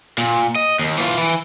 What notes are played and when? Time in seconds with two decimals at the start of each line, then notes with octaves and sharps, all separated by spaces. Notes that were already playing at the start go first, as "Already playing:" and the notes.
0.18 A#2
0.56 D#5
0.79 D#2
0.98 E3 F4
1.18 E3